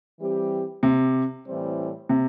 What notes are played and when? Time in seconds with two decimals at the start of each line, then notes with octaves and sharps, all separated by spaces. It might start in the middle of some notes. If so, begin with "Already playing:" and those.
0.19 E3 G3 C4 G4
0.83 C3
1.46 A2 E3 G3 C4
2.09 C3